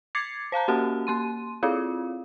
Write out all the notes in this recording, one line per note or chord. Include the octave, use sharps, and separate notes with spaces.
D6 G#6 A6 C7 C#7
C5 F5 A5 A#5
A#3 C#4 F#4 G4 F#5 A5
A#3 C6 D#7
C4 E4 F4 G#4 F5